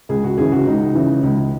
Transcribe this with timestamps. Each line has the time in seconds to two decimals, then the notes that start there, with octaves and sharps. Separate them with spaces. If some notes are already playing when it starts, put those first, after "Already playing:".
0.09 C#2 G#4
0.24 F#4
0.38 C#3 E3 G#4
0.52 F#4
0.67 C#2 D#4
0.95 C#3 E3
1.23 C#2